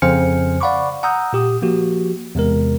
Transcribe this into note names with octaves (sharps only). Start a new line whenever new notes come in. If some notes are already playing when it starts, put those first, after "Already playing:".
F2 C#3 C5 G#5 F6 C#7
D5 F5 F#5 B5 C#6 D6
F#5 A#5 D#6 E6 G6
A#2 G4 D#6
F3 A#3 F#4 G4
E2 C3 G#3 A#4